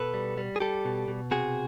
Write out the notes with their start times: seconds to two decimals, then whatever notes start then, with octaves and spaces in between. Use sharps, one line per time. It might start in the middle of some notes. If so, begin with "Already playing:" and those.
Already playing: B2 A4 B4
0.14 G3
0.38 G3
0.56 G#4
0.60 G3 G4 A4
0.85 B2
1.08 B2
1.31 C3 F#4 G#4